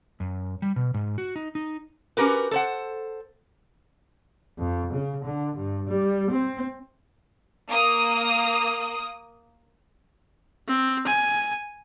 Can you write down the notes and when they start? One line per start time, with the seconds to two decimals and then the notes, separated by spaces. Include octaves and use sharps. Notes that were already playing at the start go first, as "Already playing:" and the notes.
0.20 F#2
0.62 G3
0.76 B2
0.94 G#2
1.18 F#4
1.36 D#4
1.55 D#4
2.17 C#4 F#4 G4 A#4 B4
2.51 A4 C5 F#5
4.59 F2
4.94 C#3
5.24 D3
5.57 G2
5.88 G3
6.31 C4
7.70 A#3 D#6
10.68 C4
11.07 G#5